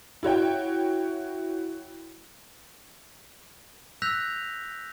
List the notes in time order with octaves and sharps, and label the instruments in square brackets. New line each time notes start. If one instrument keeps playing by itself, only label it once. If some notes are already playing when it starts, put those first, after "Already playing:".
[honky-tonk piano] E4 F#4 C#5 G5
[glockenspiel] E6 F#6 G6 A#6 B6 F7